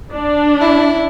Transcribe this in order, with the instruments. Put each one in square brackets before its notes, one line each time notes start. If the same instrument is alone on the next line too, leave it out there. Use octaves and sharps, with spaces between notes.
[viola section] D4
[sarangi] E4